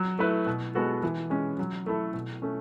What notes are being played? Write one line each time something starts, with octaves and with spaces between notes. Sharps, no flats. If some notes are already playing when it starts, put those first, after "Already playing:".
Already playing: F#3
A3 E4 B4
B2
G#3 B3 F#4 A4
E3
G#3 C#4
F#3
A3 E4 A4
B2
A3 C#4